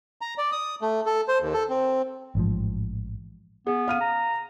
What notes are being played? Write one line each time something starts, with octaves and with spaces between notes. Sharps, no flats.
A#5
D5
D#6
A3
A4
C5
D#2
A4
C4
A1 G#2 F3
B3 G#4
F5 F6 D#7
A#5